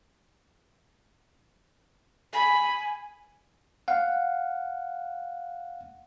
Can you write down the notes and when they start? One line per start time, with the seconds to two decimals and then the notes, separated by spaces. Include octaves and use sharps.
2.33 G#5 B5
3.88 F5 F#5